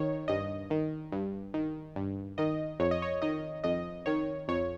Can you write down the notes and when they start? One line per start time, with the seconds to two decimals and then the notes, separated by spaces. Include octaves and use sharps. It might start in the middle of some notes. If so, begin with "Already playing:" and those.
Already playing: D#3 C#5
0.28 G2 D#5
0.70 D#3
1.12 G2
1.54 D#3
1.96 G2
2.38 D#3 D#5
2.80 F2 C#5
2.91 D#5
3.02 C#5
3.22 D#3 D#5
3.64 F2 D#5
4.06 D#3 C#5
4.48 F2 C#5